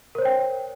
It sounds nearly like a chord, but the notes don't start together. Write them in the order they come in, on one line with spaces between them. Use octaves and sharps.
A#4 C5 C#5 G5